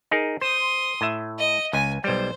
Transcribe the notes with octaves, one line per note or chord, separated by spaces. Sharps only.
D#4 G#4 A#4
C5 C6 D#6
A2 E5
D#5
C#2 G#5
B1 G3 C5